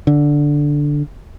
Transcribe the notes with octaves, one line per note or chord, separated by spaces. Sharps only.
D3